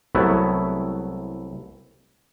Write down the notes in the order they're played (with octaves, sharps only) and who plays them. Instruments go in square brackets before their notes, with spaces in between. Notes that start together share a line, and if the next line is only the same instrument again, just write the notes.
[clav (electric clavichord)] C2 F#3 A3 B3 E4